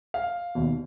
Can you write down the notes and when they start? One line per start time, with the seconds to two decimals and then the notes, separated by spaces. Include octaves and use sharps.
0.14 F5
0.55 D#2 B2